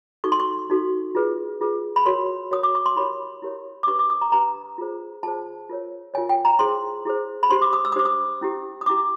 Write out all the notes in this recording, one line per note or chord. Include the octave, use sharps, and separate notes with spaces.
D#4 F#4 A4 C#6
C6
C#6
D#4 F#4 A4
F4 G#4 B4
F4 G#4 B4
B5
F#4 A#4 C#5 C6
F#4 A#4 C#5 D#6
D6
C#6
C6
E4 G4 A#4 C#5 B5
E4 G4 A#4 C#5
D6
D4 G4 B4 C#6
D6
D#6
A#5
D4 G4 B4 A#5
F4 G#4 C5
F4 G#4 C5 A5
F4 A#4 C#5
F4 A#4 C#5 G#5
G5
A#5
E4 G#4 C5 C6
E4 G#4 C5
B5
D4 G4 C5 C6
D6
D#6
E6
D#6
D4 G4 C5 D6
D#6
C#4 E4 G4
D#6
C#4 E4 G4 D6